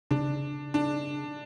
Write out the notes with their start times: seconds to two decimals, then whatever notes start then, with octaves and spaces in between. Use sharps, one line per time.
0.11 C#3 D4
0.74 D4